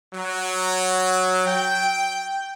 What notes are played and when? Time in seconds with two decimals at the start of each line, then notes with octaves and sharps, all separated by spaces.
0.15 F#3
1.47 G5